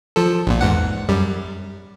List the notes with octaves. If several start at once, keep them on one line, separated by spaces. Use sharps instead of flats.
F3 A4
A#1 A#2
E2 G#2 F#5
F#2 G3